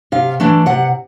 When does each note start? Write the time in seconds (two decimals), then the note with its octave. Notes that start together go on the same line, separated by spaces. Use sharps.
0.12 C3 F5
0.40 E3 A3 D4
0.66 C3 F#5